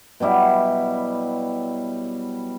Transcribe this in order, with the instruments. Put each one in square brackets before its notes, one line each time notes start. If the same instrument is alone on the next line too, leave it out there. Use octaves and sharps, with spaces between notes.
[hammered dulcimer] B2 F#3 G3 E4